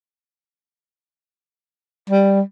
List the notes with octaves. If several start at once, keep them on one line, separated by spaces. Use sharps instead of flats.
G3